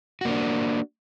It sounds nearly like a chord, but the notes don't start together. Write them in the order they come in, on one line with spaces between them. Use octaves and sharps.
F#4 A#3 D4